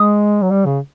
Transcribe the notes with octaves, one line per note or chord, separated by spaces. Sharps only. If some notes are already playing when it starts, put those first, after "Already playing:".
Already playing: G#3 D#6
F#3
G3
C#3